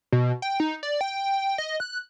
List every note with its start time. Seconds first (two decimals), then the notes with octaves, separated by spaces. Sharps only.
0.13 B2
0.42 G5
0.60 D#4
0.83 D5
1.01 G5
1.58 D#5
1.80 F#6